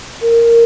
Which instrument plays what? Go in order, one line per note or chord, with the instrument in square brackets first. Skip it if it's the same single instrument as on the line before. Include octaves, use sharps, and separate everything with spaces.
[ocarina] A#4